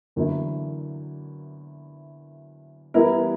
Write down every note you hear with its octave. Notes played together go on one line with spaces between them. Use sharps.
E2 D3 F#3 A#3 E4
E3 G3 B3 E4 A#4